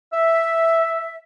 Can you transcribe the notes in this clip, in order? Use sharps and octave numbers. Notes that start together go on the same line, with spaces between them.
E5